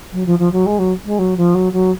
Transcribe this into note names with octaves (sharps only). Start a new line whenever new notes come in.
F#3
F3
F3
F#3
G#3
F#3
G#3
F#3
F3
F#3
F#3